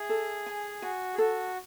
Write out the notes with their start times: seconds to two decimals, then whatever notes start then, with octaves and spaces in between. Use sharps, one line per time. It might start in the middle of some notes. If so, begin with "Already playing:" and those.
Already playing: G#4 E5
0.09 A4
0.46 G#5
0.82 F#4 G#5
1.14 G#4
1.18 F#4 A4